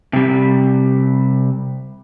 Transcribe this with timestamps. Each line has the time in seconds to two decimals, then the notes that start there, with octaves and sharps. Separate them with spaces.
0.13 C3 G3